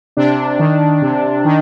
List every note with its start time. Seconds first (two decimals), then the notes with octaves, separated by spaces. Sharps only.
0.17 C3 D4
0.59 D#3
1.02 C3
1.45 D#3